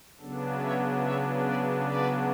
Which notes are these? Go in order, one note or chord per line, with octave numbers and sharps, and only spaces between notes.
C#3 F#3 B3 D4 A4
C#5 E5
C#5 E5
B4 D5
B4 D5